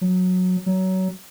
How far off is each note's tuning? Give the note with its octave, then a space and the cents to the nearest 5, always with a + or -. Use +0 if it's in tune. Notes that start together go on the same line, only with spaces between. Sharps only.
F#3 -15
F#3 +20